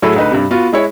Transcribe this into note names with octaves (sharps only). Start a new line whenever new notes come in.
A2 F#3 A3 E4 G#4 A4
D2 D#4 B4
G2 C3
B3 F4 F#4
G#3 E4 C#5